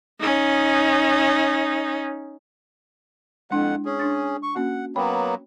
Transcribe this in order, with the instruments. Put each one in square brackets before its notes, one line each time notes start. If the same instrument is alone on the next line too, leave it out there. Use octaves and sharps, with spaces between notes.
[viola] C#4 D#4
[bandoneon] F2 F#5 [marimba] G#3 D4 E4
[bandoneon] C#4 G#4
[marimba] D4 A6
[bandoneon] C#6
[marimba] A#3 C#4 F#4 [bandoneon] F#5
[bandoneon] F#3 A#3 B3 [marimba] C#5 G5 B5